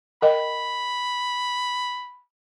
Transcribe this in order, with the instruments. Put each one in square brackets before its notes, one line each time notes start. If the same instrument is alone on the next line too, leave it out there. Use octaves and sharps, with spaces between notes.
[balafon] A#4 D#5 G5 [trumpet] B5